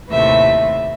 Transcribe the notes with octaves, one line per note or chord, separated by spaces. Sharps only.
D#2 A2 C3 A3 B4 E5